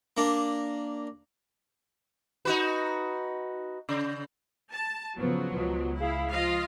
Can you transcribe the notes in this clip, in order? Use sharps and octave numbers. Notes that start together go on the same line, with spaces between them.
A#3 D4
D#4 F#4 B4
C#3
A5
C#3 F3 F#3 B3
C#2 B2 B3 F4
E4 G#4 F5
F3 F4 D#5 F5